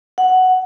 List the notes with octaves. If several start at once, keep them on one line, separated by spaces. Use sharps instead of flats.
F#5